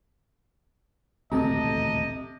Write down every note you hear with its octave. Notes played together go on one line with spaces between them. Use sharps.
D#1 A1 D2 C3 A4 D#5 A5 A#5